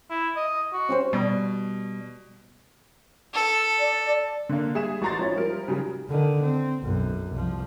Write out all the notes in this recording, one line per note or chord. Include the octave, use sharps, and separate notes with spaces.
E4
D#5
F#4
C#4 G4 C5
B2 G3
A4
D5
D3 A#3
G3 G#4 E5 E7
A1 F#4 A#5 C6 A6
F3 C#4 E4
F3 G3 A#4
C#3 F#3 G3
D3 D#3
C4
B1 F#2
C2 F3